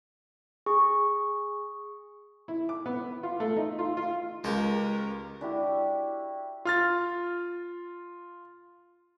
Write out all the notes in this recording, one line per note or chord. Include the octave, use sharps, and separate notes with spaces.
G#4 C#6
E4
D6
B3
F4
A3
D#4
F4
F4
C#2 G#3 G4 A#4
D4 E4 F#4 G4
F4 F6 A6